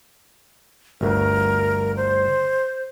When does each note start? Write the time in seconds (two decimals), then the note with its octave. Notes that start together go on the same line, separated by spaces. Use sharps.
1.01 G1 D2 A#4
1.96 C5